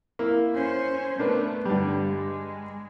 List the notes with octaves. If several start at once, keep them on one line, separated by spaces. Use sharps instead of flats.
A#3 E4
C#4 C5
A3 B3 D4 A#4 B4
G2 D3 G3 B3 D4
G#3